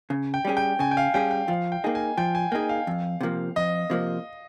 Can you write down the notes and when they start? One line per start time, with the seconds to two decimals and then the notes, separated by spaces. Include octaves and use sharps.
0.10 C#3
0.34 G5
0.45 G3 C#4 G#4
0.57 G5
0.79 C#3 G#5
0.91 G5
0.97 F5
1.14 G3 C#4 G#4 G5
1.31 G5
1.48 F3 F5
1.72 G5
1.84 A#3 D#4 G#4
1.95 G#5
2.17 F3 G5
2.35 G#5
2.52 A#3 D#4 G#4 G5
2.69 F5
2.87 F2
3.21 C3 F3 A#3
3.56 F2 D#5
3.90 C3 F3 A#3